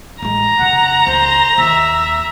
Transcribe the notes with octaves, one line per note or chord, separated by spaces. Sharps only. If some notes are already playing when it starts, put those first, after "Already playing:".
A1 G#3 A#5
F2 C#3 F#5
C#2 C5
D#2 E5